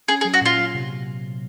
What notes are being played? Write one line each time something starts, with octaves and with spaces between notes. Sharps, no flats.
C#4 G#4
G#4
F#3
F#4
A#2 F4
F#3
C3